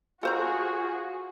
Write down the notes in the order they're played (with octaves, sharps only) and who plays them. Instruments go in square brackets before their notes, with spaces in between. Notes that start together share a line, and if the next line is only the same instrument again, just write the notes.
[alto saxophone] F4 [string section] F#4 G#4 [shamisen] A4 C5 A#5